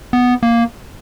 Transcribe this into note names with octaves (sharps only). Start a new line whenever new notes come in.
B3
A#3